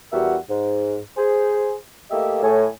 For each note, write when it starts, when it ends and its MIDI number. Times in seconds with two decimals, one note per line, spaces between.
0.13 0.36 40
0.13 0.36 55
0.13 0.36 66
0.13 0.36 70
0.13 0.36 76
0.13 0.36 78
0.49 0.97 44
1.17 1.74 68
1.17 1.74 72
2.11 2.42 57
2.11 2.42 58
2.11 2.42 67
2.11 2.42 75
2.11 2.42 76
2.43 2.66 45
2.43 2.66 73
2.43 2.66 80